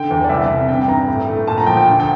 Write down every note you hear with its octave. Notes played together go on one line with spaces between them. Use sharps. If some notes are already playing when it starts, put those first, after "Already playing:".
Already playing: D3 G5
E2
D5
C2 E5
C3
G2 G5
G2 A#5
A2
A3
A#2 A5
A#5
F3 G5
G5
D2
G5